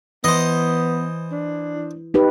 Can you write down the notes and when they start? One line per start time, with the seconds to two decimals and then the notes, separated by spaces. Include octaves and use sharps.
0.24 E3 B3 C5 D#5
1.32 D4
2.14 D#4 G4 B4